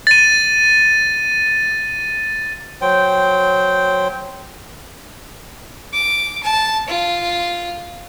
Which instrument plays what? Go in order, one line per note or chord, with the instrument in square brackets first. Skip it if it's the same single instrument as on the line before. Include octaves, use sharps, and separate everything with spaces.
[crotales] A6 D#7
[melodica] F#3 C5 G5
[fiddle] D6
A5
F4